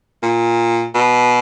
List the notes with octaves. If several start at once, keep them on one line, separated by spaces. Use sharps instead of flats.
A#2
B2